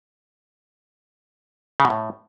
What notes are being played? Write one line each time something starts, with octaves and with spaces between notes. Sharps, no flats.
C#3
B2
A2